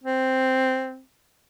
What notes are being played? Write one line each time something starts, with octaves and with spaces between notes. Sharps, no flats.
C4